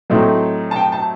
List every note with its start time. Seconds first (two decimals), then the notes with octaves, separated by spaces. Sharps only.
0.10 A2 F#3 A3 C4 D#4
0.71 A5
0.76 G5
0.92 A5